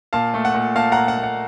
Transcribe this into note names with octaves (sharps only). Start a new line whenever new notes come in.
A#2 F5 A5
A3
F#5
A#2
A#2 F5 A5
F#5 A#5
A#2
F#5
A#2
F#5